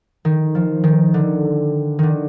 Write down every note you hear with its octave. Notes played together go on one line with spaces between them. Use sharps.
D#3
F3
D#3
D3
D3 D#3